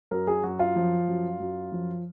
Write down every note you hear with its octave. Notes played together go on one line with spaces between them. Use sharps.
F#2 A#4
G#4
F#2 F#4
F4
F3
F#2
F#2
F3